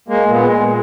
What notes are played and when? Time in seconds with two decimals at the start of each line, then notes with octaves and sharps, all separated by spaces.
0.08 G#3 A#3
0.26 A#2
0.32 B3
0.43 G#3
0.59 A#2